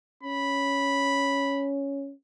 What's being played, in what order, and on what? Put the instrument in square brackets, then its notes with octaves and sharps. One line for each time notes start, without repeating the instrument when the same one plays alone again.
[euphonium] C#4 [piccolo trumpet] B5